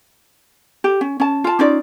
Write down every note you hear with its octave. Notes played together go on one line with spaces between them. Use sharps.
G4
C#4
C#4 A5
F4 A5
C#4 D#4 F4 D5